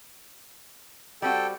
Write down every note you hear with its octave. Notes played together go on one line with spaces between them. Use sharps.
G3 C4 F#4 A4 G5